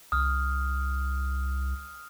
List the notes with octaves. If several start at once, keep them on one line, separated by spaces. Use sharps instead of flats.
C2 D#6 F6